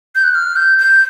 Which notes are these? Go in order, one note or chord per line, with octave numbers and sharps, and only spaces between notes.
G6
F#6
F6
G6
G6